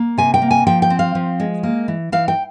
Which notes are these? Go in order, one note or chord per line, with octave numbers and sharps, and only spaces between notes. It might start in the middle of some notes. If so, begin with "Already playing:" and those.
Already playing: A#3
C3 G#5
G5
A#3
G#5
F3 G5
G5
C4
F5
F3
G#3
A#3
E3
E3 F5
G5